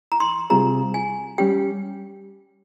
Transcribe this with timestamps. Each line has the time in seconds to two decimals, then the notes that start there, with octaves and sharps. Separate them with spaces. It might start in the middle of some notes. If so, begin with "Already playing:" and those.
0.12 A#5
0.20 C6
0.50 C3 G3 C4 F4 G#4 A#5
0.94 G#5
1.38 G3 C#4 G4 G5